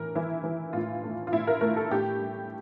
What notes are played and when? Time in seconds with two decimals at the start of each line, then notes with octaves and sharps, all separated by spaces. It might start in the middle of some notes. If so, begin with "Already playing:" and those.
Already playing: A2 E3 A#4
0.15 E3 E4
0.44 E3
0.73 A2 F4
1.03 A3
1.27 F4
1.32 A2 E4
1.47 A#4
1.61 A3 A#4
1.76 A4
1.91 A2 G4
2.20 G3